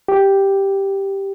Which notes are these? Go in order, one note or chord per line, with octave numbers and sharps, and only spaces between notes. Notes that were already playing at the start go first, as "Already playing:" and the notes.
G4